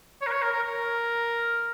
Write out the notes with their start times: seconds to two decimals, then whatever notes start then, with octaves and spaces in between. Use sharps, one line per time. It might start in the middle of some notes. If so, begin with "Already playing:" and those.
0.22 C#5
0.27 A#4
0.32 C#5
0.42 A#4
0.53 A#4
0.63 A#4